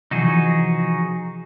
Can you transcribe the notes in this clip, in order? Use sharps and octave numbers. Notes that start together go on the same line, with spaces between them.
C3 E3 F3 D#4 F#4 G#4